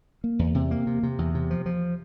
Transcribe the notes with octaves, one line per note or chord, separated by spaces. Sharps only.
A#3
E2
C3
A#3
C3
C3
E2
C3
F3
F3